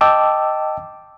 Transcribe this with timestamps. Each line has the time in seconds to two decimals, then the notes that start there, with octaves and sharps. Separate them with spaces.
0.01 D#5 G5 A5 D6 E6